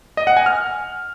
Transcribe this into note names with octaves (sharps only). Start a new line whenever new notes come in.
D#5
F#5
G#5
F6